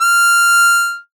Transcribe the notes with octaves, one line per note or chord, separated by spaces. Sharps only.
F6